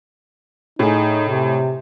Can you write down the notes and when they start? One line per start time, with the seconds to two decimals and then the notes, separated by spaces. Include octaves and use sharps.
0.79 A2 D#4 G#4
1.28 C3